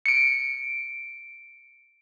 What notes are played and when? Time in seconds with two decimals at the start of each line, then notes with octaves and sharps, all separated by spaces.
0.06 C#7 D7